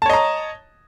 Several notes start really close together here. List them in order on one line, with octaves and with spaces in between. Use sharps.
A5 C#5 D#5 A#5